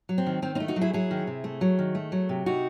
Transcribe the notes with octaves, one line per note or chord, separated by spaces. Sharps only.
F#3
C4
D#3
D#3 C4
C4 D#4
A3
D#4 F#4
F#3
E4 G#4
F#3 E4 G#4
D#3
C3
A3
F#3
D#3
A3
F#3
C3
C3 D#4 F#4